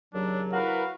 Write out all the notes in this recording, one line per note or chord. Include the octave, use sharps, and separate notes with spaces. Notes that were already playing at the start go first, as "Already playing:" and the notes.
D#2 C#3 F#3 D4
E4 F#4 A#4 B4 F5